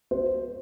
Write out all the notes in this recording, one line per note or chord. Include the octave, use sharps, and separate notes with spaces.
C5